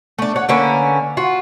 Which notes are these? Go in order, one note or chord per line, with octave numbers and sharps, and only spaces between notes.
A3 D4
C#5 F#5
D3 A#3 C#4 B4
F4 F#4